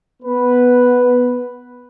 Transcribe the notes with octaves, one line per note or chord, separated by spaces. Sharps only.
B3 B4